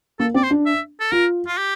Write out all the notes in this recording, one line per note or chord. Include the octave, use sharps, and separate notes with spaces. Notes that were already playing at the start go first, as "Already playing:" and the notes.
A#3 A4
C4 D5
C5
D4
E5
A4
F4 A#4
F4
G4